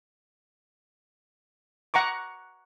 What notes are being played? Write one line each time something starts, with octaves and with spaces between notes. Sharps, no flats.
F#5 A#5 C#6 D6